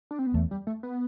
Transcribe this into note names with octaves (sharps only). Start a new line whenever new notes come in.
D4
C4
B3
E2 A3
G3
A3
B3